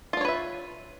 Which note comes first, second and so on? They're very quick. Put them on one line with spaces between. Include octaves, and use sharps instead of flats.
F4 D4 C#5 B4 E5